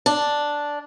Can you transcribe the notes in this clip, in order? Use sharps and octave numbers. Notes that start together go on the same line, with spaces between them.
D4